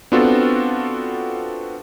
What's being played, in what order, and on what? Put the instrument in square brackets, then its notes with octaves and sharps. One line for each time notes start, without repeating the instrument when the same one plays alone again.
[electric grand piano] B3 C4 D4 F4 F#4 A4